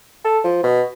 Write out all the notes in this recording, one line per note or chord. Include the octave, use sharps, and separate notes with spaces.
A4
F3
B2